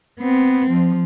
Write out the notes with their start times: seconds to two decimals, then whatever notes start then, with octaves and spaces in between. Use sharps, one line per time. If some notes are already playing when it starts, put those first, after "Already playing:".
0.21 B3 C4
0.71 F3